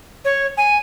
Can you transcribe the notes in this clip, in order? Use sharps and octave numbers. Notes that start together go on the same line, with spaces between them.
C#5
G#5